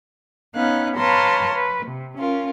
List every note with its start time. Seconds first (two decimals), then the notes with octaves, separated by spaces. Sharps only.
0.55 B3 C#4 D#4 F5 F#6
0.96 B4 C#5 F5 A5 A#5 C6
1.54 B4
1.85 C3
2.18 C#4 F4 A#4